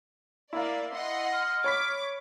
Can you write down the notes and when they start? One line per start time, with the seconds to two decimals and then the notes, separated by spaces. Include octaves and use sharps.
0.53 A#3 E4 D5 F5
0.93 D#5 F#5 C6
1.33 F6
1.64 C#5 B5 D6 B6